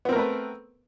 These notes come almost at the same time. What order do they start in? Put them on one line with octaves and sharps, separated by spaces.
B3 C4 A#4 A3 B4